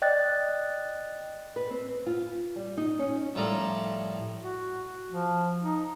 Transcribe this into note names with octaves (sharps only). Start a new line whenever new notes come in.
D5 D#5 G5 F#6 A6
B4
C4
F4
G3
D#4
C#4
A2 F3 G3 A4 A#4 D5
F#4
F3
D#4